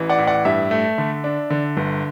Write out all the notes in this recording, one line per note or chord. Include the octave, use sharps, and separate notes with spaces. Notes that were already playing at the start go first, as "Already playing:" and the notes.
Already playing: A1 E3
D5 F#5
A2
D5 F#5
G2 E5
A3
D3
D4
D3
G1